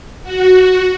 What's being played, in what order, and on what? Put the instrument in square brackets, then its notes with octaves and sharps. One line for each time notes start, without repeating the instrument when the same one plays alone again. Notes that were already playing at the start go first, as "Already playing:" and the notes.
[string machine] F#4